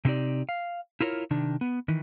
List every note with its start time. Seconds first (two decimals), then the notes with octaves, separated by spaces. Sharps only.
0.05 C3 A3 C4 D#4 G4 D5
0.49 F5
1.00 E4 F4 A#4 B4 C#5
1.31 C3 D#3 D4
1.61 B3
1.88 D#3 E3